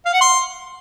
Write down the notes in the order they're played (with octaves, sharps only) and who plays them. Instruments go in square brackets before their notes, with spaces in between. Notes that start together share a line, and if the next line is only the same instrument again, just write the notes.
[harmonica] F5
F#5
C6